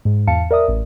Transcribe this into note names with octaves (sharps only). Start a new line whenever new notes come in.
G#2
E2 F5 A5 C#7
A#4 D5 E5 D#6
A1